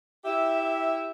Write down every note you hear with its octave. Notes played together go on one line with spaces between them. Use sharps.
E4 G4 E5